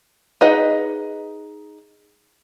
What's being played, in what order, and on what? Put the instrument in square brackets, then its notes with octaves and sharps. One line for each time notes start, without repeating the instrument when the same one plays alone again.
[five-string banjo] D#4 G#4 B4 D#5 F#5